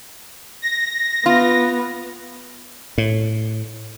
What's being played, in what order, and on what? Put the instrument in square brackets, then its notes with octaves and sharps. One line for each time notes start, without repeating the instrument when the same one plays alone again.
[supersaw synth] A#6
[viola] B3 [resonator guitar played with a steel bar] F4
[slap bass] A2